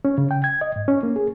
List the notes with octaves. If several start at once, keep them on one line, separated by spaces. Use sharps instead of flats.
C#4
C#3
G5
G#6
D#5
G#2
C#4
A#3
G#4